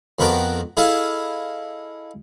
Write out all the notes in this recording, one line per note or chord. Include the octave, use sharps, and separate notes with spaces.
F2 B3 F#4 A#4 G5 A5
E4 G#4 A4 D#5 F5